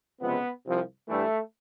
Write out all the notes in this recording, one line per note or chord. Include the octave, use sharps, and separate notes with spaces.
C#2 C3 F3 G#3 B3
C2 C3 F3
G2 E3 G3 A3